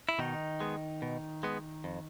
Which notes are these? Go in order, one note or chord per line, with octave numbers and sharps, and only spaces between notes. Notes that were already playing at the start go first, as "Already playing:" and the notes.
E4
B2 D#3 D#4
G#3 B3
B2
G#3 B3
F2